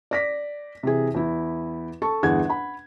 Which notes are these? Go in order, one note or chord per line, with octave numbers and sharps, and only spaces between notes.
D5 A#6 B6
C3 E3 G#4
E2 E4
A4 A5 C#6
G1 E2 G#4 F#5 G#6
F#5 B5